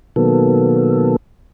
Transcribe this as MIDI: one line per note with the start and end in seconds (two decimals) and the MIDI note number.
0.16 1.16 47
0.16 1.16 51
0.16 1.16 54
0.16 1.16 58
0.16 1.16 59
0.16 1.16 69